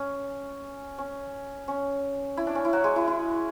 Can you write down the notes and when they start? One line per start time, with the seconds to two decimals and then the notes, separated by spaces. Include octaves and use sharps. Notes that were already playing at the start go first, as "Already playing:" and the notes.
Already playing: C#4
0.98 C#4
1.68 C#4
2.37 E4
2.47 D4
2.55 C#4
2.65 E4
2.73 F#3 F#4
2.84 G#3 G#4
2.96 E4
3.08 E4